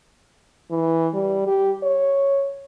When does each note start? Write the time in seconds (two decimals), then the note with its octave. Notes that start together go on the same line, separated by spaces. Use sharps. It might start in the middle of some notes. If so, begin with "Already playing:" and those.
0.71 E3
1.14 G3
1.47 G4
1.83 C#5